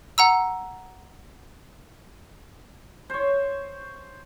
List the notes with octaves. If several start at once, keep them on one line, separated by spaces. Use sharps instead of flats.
F#5 A#5 E6
C5 C#5